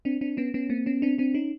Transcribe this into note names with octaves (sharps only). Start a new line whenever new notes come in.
C4 D4
C4 D4
B3 C#4
B3 C#4
A#3 C4
B3 C#4
C4 D4
C4 D4
C#4 D#4